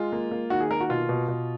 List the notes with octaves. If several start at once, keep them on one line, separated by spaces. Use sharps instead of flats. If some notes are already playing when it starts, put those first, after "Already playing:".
Already playing: G#3 F4
A#3
A#3
D#3 F#4
G#4
A#3 A#4
F#4
B2 F4
B2
B2